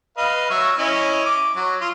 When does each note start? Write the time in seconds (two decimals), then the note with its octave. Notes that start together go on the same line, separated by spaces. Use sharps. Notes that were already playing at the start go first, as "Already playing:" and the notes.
0.18 B4 D#5 F5
0.50 F#3 E5 C#6
0.78 C#4 E4 D#5
1.26 D6
1.56 F#3
1.81 F4 C6